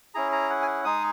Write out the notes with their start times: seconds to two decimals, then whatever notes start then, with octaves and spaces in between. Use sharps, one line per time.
0.14 C#4 E4 G#4 A#5
0.32 A#5
0.50 F#5
0.62 G#5
0.67 F#5
0.85 G#3 D#4 G#4 D#6